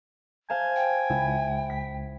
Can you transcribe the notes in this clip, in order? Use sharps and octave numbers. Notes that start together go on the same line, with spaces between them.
C5 F5 G#5 A5
G5
C#2 E4
B6